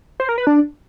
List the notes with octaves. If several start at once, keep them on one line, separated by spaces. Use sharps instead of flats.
C5
A#4
B4
D4